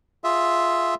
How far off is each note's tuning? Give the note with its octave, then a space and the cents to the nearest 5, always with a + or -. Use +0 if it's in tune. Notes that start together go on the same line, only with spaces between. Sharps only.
F4 +0 G#4 +5 E5 +0